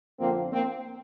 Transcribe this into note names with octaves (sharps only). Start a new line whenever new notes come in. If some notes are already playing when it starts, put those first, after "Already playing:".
F2 D3 A#3 C4
A#3 C4